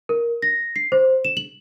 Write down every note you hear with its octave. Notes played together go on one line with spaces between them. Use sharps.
A#4
A#6
C7
C5
E7
F#7